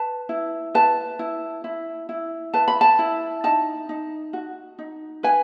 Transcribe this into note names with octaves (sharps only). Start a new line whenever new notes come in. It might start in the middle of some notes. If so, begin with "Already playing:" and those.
Already playing: B4 A5
E4
B4 A5
E4
E4
E4
B4 A5
B5
A5
E4
D#4 A5
D#4
F#4
D#4
B4 G#5